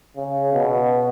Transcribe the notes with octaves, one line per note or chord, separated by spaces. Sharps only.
C#3
B2